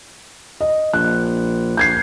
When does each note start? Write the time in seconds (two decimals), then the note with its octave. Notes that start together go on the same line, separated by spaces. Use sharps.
0.61 D#5
0.93 A#1 F#6
1.77 A#1 G6 G#6 C7